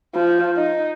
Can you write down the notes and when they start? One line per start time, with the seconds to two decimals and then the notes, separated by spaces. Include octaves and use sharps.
0.15 F3
0.56 D#4